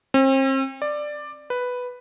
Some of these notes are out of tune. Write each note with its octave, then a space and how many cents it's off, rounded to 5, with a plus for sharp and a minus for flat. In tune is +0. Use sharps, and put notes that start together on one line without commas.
C4 +40
D5 +10
B4 +0